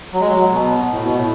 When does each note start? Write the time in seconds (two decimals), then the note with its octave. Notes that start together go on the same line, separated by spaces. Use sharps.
0.13 F#3
0.21 G#3
0.28 F#3
0.52 B2
0.92 A2
1.04 B2
1.16 A2